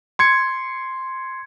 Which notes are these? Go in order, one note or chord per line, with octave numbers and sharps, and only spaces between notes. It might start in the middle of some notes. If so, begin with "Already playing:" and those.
C6 G#6 C#7